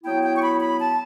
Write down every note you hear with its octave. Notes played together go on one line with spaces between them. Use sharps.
F#3 B3 E4 G5
G5
C#6
B5
B5
A5